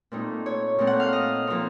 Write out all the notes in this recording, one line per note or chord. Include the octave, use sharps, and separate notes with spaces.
A#2 A3 C4 D#4
C#5
A#2 A3 C4 D#4
F#5
F5
D#5
A#2 F3 C4 D#4